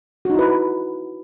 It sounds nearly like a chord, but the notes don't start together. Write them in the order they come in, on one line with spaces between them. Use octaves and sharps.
F#4 D#4 E4 B4